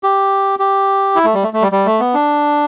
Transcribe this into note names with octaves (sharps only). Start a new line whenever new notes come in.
G4
G4
E4
A3
G3
A3
A3
G3
G3
A3
B3
D4